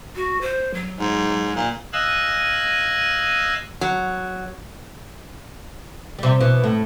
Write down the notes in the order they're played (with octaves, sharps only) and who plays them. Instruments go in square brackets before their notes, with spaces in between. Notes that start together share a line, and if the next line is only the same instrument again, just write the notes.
[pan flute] F#4
C5
F#3
[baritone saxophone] G#2
A#2
[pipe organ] D#5 F5 G#5 E6 F#6
[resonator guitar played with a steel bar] F#3
[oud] C3 G3
B2 E3
A2